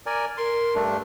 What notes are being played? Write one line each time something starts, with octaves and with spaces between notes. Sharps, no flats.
A#4 D5 G#5
A#4 C6
G2 A3 D4